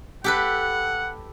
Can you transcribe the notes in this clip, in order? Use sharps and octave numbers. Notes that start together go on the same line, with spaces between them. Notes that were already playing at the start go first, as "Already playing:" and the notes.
G4 A4 B4 F#5